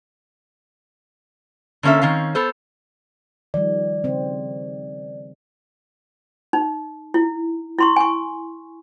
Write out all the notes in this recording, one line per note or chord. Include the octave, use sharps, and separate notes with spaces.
D3 A#3 C#4 A4 E5
D#3 C4 C#4 F5
B3 A4 C5
D#3 F3 G3 D5
C#3 C4
D#4
E4
E4 C6 C#6
G#5 C#6